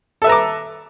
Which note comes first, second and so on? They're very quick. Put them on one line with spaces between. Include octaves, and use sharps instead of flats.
A4 E5 B4 A#5 D6